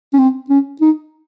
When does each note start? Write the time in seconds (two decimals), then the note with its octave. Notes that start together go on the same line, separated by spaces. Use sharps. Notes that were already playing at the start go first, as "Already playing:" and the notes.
0.14 C#4
0.19 C4
0.50 C#4
0.81 D#4